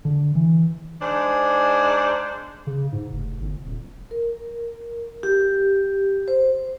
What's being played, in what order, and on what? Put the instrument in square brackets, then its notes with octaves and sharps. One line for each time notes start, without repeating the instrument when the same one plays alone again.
[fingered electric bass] D3
E3
[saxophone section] G#2 D4 C5
[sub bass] C#3
G#2
F1
G1
D#1
[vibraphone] A#4
G4
C5